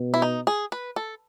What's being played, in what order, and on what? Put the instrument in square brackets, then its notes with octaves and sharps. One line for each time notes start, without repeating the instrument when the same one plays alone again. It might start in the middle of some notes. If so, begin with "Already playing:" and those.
Already playing: [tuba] B2
[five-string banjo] E4
D#4
G#4
B4
A4